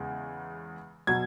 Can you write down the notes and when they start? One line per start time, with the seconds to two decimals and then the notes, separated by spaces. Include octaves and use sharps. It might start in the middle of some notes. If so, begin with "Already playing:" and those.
Already playing: E2 C#3 G#3
1.07 B2 F#3 G#6